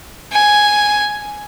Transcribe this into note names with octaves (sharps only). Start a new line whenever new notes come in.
G#5